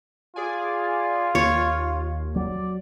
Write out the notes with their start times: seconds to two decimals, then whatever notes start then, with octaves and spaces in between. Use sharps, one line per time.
0.36 F4 G#4 D5 G#5
1.35 D#2 C#5
2.36 F#3 D5